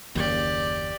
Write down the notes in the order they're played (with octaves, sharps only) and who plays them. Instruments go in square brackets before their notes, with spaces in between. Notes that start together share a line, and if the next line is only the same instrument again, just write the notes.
[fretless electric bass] F#1 D#2 [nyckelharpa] G4 D5